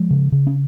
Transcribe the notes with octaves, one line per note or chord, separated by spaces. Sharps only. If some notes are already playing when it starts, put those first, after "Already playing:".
Already playing: F3 G#3
C#3
C#3
C#4